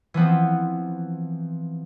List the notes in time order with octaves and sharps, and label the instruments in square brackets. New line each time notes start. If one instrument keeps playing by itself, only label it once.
[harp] E3 F3 B3 C4